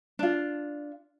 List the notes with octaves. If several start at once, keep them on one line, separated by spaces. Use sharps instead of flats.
D4 F4